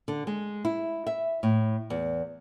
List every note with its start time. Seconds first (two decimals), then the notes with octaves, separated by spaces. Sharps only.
0.08 D3
0.27 G#3
0.65 E4
1.07 E5
1.43 A2
1.90 E2